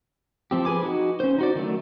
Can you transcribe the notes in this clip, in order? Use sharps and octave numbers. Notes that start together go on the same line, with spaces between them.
F3 C4 G4
G#4 B4 G#5 D6
D#4 F#4
C#4 C5
D#4 F#4 D5
D#3 F#3 A3